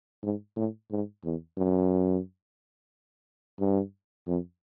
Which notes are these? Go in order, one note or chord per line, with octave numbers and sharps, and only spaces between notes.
G#2
A2
G#2
E2
F#2
G2
F2